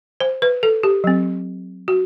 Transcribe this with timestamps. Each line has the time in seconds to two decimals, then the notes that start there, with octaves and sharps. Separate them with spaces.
0.20 C5
0.42 B4
0.63 A4
0.83 G4
1.04 F#3 C4
1.88 F#4